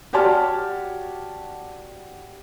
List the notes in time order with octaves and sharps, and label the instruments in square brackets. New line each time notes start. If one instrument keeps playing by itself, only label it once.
[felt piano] F#4 G4 C#5 D5 A5 F6